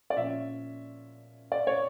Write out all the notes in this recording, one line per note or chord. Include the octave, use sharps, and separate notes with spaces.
D5
A#2 F3 C#4 E5
D5
C#5